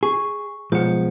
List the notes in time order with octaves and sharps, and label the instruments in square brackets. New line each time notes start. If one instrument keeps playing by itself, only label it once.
[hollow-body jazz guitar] G#4 [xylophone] C#6
[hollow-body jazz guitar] B1 F3 G#3 [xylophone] C5 F#5